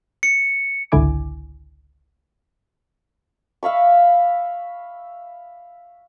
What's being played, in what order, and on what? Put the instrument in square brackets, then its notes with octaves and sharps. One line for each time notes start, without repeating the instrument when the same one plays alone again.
[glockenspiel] C#7
[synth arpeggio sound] G#1 C#2 D3 E4 G#5 D6
[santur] E5 F5 B5 C#6